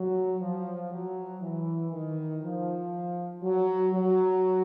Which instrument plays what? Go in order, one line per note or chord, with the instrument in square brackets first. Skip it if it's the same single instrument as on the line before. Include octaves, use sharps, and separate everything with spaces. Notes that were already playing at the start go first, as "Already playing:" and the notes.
Already playing: [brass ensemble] F#3
F3
F#3
E3
D#3
F3
F#3
F#3